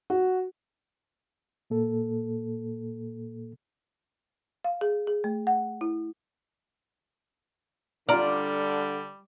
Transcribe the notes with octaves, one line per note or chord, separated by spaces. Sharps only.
F#4
A#2 A#3 A4
F5
G#4
G#4
A3
F#5
E4
D3 G3 F4 D5 A#5 F6